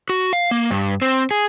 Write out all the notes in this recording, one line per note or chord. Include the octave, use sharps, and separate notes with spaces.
F#4
F5
A#3
G2
C4
G#4